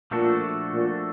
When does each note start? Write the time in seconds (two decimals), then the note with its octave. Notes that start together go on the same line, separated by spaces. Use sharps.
0.11 A#2 F3 A3 D4 F#4 A4
0.74 A#2